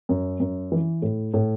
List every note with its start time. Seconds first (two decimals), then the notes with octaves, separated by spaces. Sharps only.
0.09 F#2
0.40 F#2
0.72 E3
1.02 A2
1.34 A2